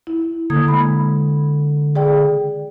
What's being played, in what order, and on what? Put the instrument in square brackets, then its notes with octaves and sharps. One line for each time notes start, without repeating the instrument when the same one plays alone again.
[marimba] E4
[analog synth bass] D3 [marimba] A#3 D#6 G#6
[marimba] G#3 B5
G#4 D5 G5